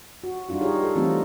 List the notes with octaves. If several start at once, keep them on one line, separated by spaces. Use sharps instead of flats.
F#4
G3 D4 D#4 F4 F#4
D#4 G4 G#4 C#5
A4
E3 G3 A3 C4 D#4 F4